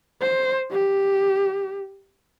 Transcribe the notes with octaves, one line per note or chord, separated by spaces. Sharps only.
C5
G4